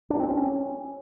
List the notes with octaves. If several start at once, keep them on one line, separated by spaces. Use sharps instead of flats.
D4
C4
C#4